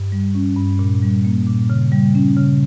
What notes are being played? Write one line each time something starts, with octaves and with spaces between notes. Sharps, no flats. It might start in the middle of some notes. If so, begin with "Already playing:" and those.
Already playing: G2
G3
C#4
G2
A#2
G3
A#3
A#2
C#3
G3
C#4
C#3